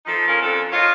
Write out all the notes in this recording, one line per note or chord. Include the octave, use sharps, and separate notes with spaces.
F3 D#4 A4
C#4 F4 A#4
F2 D4 A4
F4 C#5 D#5